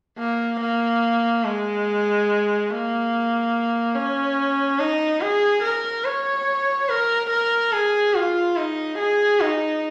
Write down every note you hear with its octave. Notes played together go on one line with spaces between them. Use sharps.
A#3
A#3
G#3
A#3
C#4
D#4
G#4
A#4
C#5
A#4
A#4
G#4
F4
D#4
G#4
D#4